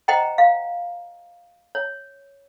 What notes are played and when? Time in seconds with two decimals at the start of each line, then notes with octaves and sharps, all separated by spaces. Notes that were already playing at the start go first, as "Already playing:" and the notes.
0.08 C5 D#5 F#5 G5 A#5
0.38 F5
1.75 C#5